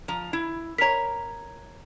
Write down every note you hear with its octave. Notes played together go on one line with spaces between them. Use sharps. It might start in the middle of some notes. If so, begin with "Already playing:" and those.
F3 A#5
E4
A#4 C#5 A#5 B6